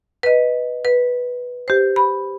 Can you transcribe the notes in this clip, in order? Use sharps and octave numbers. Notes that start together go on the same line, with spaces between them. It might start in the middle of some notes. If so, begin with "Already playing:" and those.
B4 D#5
B4
G4 C5
B5